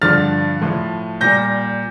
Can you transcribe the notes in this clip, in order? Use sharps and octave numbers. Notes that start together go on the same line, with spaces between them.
G2 D3 F3 F6 A6
A2 F3
A#2 G3 G6 A#6